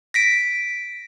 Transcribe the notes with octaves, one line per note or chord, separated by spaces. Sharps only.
A#6 B6 D7